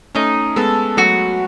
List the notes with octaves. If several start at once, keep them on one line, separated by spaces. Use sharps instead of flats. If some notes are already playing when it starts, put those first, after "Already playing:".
A3 C#4 D#4
G#3 B3 A4
F#3 A3 F#4